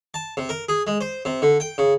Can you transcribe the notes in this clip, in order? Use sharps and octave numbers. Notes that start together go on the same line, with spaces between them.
A5
C3
A#4
G#4
G#3
C5
C3
D3
G5
C#3